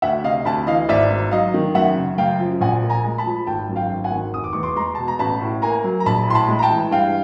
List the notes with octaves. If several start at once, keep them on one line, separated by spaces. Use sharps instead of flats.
D2 E5 F#5
C3 D#5 F5
D2 A5 B5
E3 D#5 F5
G#1 D5 E5
G#2
F#3 D#5 F5
D#3
F#2 E5 F#5
C#3
F#2 F5 G5
F3
A#1 F#5 G#5
A#2
G#5 A#5
G#3
A5 B5
F3
G#1 G5 A5
F#2
F5 G5
G#1
F#5 G#5
D#3
F1 D#6
D6
E2 C#6
C6 D6
G#3 A#5 C6
B2 A5
A#5
A1 A5 B5
A2
A#3 G#5 A#5
F#3
A#5
A#1 A5 B5
A2 C6
A5 B5
G#3
A#5
G5 A5
E3
G2 F5 G5